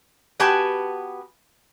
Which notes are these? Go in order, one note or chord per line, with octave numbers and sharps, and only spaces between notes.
B3 F#4 G4 B4 G#5 A5